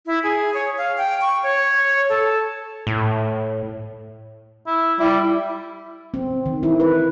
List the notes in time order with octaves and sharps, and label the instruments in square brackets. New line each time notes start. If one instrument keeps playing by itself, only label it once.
[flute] E4
G#4
C#5
F5
G5
C#6
C#5
A4
[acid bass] A2
[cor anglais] E4
[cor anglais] G3 [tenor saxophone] E4
[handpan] C4
D#3
E4
B4